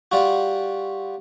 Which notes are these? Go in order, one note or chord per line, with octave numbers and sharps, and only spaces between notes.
G3 F4 F#4